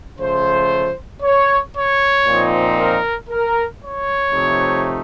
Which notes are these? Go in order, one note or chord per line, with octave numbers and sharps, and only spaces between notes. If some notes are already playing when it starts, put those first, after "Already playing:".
C#3 F3 A3 C5
C#5
C#5
A#2 F3 C4 D#4
A#4
A#4
C#5
C3 F3 A3 D#4